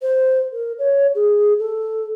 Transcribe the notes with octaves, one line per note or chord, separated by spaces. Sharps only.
C5
A#4
C#5
G#4
A4